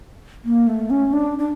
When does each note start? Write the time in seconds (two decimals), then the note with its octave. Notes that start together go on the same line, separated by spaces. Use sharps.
0.45 A#3
0.67 A3
0.90 C#4
1.13 D4
1.38 D4